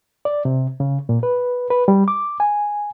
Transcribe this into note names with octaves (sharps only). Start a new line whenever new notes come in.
D5
C3
C#3
A#2
B4
B4
G3
D6
G#5